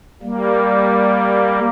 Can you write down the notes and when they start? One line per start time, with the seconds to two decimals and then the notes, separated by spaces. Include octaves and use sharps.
0.23 G3 A#3